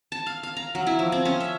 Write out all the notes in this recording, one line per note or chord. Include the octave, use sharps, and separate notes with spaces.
A5
F5
F5
A#5
F#3
E4
F3
C4
C#4
E5